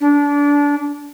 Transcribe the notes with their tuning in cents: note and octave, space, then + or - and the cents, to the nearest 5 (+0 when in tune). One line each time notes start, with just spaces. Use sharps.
D4 -25